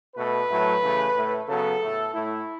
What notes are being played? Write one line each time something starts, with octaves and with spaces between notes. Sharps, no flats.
B2 A3 B4
A2 F#3 A3
C#3 E3 A3
A2 A3
C#3 F#3 B3 A4
A2 A3
A2 A3 E4